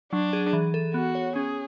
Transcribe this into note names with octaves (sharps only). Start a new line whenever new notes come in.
F#3 D4
G#4
E3
A4
B3 F#4
C#5
C#4 G#4